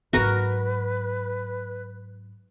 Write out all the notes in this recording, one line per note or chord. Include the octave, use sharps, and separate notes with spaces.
G#2 F#3 F#4 A#4 B4